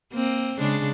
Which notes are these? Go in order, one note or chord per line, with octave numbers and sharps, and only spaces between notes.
A#3 C4
C#3 G#3 D4